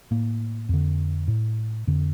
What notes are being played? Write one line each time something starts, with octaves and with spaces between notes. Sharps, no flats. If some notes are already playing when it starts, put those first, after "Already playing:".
A2 A#3
F2 D3
A2
F2 D3